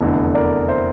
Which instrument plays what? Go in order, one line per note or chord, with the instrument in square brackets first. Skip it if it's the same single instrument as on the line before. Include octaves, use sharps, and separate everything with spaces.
[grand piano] F1 E2 D3
A#4 D5
C5 E5